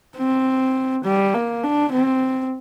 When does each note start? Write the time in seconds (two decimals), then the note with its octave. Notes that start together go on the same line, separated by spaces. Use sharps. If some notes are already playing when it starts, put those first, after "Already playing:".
0.17 C4
1.04 G3
1.34 A#3
1.63 D4
1.92 C4